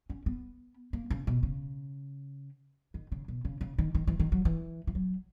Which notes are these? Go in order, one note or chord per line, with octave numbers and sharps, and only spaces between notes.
C#4
B3
A#3
C#3
B2
C#3
D#3
C#3
B2
C#3
C#3
D#3
D#3
E3
D#3
F#3
E3
E3
F#3